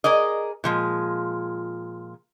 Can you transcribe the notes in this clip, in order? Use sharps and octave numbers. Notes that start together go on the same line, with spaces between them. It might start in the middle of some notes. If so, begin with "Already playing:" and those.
G#4 A#4 D5 D#5
A#2 F3 G#3